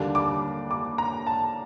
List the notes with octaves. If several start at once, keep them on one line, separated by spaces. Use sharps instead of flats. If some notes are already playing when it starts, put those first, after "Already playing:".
Already playing: D#2 D3 G3 A#3 D4
D6
D6
A#5
A5